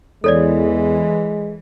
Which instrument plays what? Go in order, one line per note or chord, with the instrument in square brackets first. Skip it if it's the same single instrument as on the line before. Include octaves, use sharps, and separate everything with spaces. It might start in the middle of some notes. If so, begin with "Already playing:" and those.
[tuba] E2 [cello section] E3 [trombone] G#3 [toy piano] A4 C#5 D5